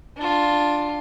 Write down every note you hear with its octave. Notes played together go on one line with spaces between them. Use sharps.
D4 F4